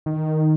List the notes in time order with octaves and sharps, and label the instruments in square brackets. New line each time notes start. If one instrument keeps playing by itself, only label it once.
[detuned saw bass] D#3